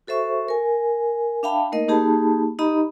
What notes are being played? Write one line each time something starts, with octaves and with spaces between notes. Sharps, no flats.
F#4 A4 C5 E5 C#6
A#4 G#5
D4 E5 F5 G5 A5 B5
A3 A#3 D#4 A#4 D#5
A#3 D#4 G4 G#4 A5 B5
D#4 G4 D#5 A#5 B5